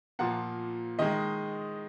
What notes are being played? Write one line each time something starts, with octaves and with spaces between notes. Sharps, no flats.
A#2 F3 A#3 F#5
D#3 G#3 D#5